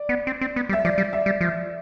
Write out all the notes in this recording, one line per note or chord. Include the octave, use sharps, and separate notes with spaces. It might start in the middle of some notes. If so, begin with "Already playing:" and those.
Already playing: D5
B3
C4
C4
B3
G3
E5
F3 D5
G3
E5
G3
F3